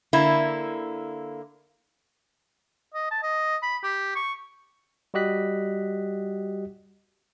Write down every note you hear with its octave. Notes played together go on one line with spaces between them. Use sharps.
D3 A#3 E4
D#5
A5
D#5
B5
G4
C#6
G3 F#4 G4 D#5 F#6 B6